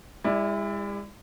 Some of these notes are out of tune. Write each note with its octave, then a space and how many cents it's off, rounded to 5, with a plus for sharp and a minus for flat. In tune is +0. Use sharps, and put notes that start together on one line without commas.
G#3 -45 E4 +0 D5 +20